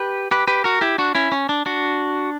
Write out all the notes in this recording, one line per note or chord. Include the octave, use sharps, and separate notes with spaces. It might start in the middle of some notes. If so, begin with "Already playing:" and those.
Already playing: G4 B4
G4 B4
G4 B4
F#4 A#4
E4 G4
D4 F#4
C#4 E4
C#4
D4
D4 F#4